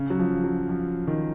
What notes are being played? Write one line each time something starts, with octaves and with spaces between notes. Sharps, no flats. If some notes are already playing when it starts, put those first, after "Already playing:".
Already playing: C#3
F#3
F3
F#3
F3
D#3